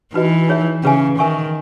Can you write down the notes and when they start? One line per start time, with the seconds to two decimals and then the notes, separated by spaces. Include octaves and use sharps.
0.14 E3 D#4 F#4 B4 D#5
0.48 D#4 G#4 C#5 E5
0.83 C#3 C#4 G#4 B4 E5 G#5
1.19 D#3 A#4 E5 G#5 C#6